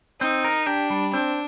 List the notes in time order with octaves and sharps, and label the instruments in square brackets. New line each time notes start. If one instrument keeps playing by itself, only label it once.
[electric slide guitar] C4 [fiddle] D#4
[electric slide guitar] A#4
[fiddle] D4 [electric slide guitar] G4
[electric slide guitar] G3
[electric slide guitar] C4 [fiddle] D4